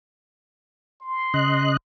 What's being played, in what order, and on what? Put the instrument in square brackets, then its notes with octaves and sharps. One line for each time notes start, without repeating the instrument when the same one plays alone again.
[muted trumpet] C6
[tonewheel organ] C#3 D#5 F#6